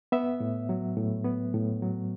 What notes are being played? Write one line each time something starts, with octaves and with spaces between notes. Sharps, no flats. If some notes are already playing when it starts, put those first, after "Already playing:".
B3 E5
A2
F#3
A2
B3
A2
F#3